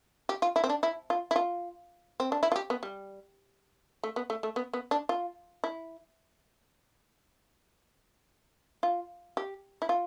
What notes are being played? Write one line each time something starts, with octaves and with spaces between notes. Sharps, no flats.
G4
F4
E4
C4
D4
E4
F4
E4
F4
C4
D4
E4
F4
G4
B3
G3
A3
B3
A3
A3
B3
B3
D4
F4
E4
F4
G4
E4
F4